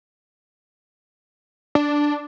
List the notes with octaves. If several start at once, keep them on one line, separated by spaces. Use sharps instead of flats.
D4